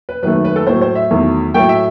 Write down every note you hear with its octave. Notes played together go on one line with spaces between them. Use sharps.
B4
F#2 D#3 A3 B4
B4
A4
A2 F#3 A3 C5
C5
E5
E2 D#3 F#3 A3
A2 F#3 A3 G5
E5